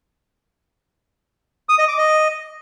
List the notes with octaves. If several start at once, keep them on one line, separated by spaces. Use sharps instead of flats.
D#6
D#5
D6
D#5